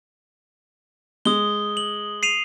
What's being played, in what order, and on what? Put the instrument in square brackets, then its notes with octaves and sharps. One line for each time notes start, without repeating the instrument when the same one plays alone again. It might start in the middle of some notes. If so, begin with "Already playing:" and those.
[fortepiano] G#3 [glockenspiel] D#6 G7
[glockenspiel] F#7
C7 D#7 F7